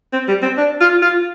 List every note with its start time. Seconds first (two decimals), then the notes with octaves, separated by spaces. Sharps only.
0.13 C4
0.28 G3
0.42 C4
0.58 D4
0.81 F4
1.02 F4